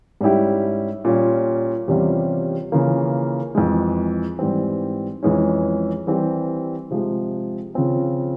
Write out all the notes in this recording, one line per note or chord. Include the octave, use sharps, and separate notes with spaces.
G#2 G3 C#4 E4 G4
A#2 G3 C#4 F4
E2 C3 G3 C#4 F4
C#3 E3 A#3 F4
F2 E3 G#3
G#2 E3 G3 C4
F2 E3 G#3 C#4
E3 G3 C4 G4
C3 F3 G#3
C#3 F3 C4 F4